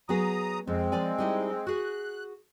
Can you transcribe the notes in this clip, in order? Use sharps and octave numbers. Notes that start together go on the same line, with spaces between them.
F#3 B3 G#4 A#5 D#6
F2 G#3 C4
F3 D5 G#5
G3 D#4 E4
F#4 G#4 F#6